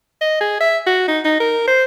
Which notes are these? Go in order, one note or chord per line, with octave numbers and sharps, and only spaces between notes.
D#5
G#4
E5
F#4
D#4
D#4
A#4
C5